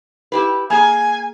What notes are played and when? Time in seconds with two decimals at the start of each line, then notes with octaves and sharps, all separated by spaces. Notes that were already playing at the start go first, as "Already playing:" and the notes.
0.32 E4 G4 B4
0.70 A#3 G#4 G#5